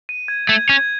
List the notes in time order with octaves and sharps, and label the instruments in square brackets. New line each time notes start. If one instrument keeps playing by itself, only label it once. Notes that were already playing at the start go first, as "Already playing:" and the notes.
[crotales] D#7
G#6
[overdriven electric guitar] A3 [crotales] G#6
[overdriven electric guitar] C#4 [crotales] G#6